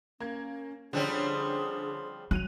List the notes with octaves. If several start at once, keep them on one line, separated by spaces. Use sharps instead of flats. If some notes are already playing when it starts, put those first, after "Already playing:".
A#3 C#4 G#6
D3 F3 G3 C4 C#4 G#4
F#3 F#6 D#7 F7